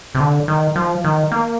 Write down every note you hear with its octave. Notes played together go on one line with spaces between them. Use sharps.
C3
D3
D#3
F3
D#3
A#3